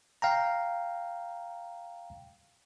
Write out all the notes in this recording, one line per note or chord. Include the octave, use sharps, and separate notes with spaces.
F5 G5 A#5